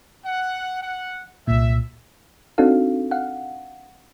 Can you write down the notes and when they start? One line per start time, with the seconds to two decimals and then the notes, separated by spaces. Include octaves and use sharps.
0.25 F#5
0.82 F#5
1.47 C2 A#2 E5
2.58 C4 D4 D#4 F#4 A4 F5
3.11 F5 F#5